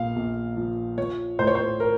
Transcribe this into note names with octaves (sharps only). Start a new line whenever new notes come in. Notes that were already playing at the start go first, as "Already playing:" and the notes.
Already playing: A#1 A#2 F5
A#1
F3
F3 C#5
A2 C5
C#5
C5
A#4